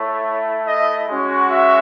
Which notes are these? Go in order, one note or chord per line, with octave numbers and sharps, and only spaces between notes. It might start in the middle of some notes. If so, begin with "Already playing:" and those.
Already playing: A3 E4 C#5
D#5
G#3 C#4 F#4
E5